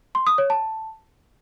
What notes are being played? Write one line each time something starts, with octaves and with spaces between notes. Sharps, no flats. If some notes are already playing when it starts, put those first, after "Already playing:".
C6
D#6
C#5
A5